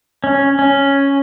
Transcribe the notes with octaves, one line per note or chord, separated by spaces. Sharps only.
C#4
C#4